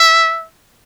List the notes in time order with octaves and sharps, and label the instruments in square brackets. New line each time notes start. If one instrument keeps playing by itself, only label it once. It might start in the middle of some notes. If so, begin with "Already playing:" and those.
Already playing: [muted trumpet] E5